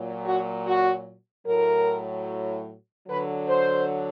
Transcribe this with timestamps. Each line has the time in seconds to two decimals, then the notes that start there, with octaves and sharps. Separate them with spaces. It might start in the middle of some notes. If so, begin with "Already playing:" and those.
Already playing: A#2 F#3
0.26 F#4
0.66 F#4
1.47 A2 F#3 A#4
3.09 D3 F#3 B4
3.49 C5